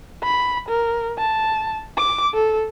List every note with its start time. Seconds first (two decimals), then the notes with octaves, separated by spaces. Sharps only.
0.23 B5
0.69 A#4
1.18 A5
1.97 D6
2.34 A4